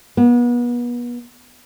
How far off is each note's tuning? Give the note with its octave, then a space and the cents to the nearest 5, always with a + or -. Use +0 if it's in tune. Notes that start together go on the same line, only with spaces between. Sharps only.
B3 -35